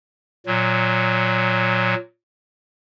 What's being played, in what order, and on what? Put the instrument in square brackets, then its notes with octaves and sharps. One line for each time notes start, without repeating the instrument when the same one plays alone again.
[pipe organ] A#2 F#3